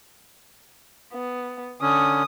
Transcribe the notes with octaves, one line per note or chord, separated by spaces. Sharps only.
B3
D3 C#4 D#6